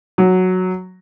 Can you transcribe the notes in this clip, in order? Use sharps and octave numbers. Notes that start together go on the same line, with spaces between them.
F#3